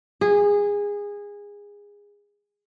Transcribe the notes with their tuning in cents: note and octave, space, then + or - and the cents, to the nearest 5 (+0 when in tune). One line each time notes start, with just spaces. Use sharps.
G#4 -20